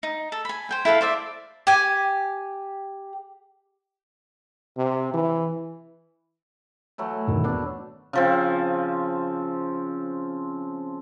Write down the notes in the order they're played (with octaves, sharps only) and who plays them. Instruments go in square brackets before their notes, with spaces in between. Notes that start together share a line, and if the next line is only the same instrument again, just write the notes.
[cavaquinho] D#4
A4
G#5 B5
C5 G5 G#5
E4 A4 B4 F5
C5 D5 E5
[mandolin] G4 G#5
[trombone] C3
E3
[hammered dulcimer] E3 F#3 A3
[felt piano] E1 D#3 A#4
[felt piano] B3 [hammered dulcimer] D4
[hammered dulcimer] C#3 F3 C4